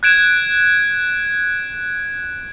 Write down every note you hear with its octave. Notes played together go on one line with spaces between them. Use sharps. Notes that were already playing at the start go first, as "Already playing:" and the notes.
F#6 G#6 D7 E7